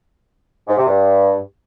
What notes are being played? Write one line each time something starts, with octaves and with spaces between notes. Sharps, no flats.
G#2
C3
G2